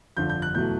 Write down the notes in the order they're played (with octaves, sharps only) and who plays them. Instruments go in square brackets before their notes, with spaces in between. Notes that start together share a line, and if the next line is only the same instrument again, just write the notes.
[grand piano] G1 F2 D3 G6
G6
F#6
E2 B2 F#3 A3 G6